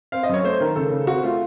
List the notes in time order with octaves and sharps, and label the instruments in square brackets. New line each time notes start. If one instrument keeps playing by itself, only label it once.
[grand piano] C4 F5
D#5
F#2 C#5
C#5
A3 C5
D#3 A#4
C#3 A4
C#3
C4 F#4
A3 F4